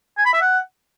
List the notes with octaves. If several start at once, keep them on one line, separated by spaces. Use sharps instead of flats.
G#5
B5
E5
F#5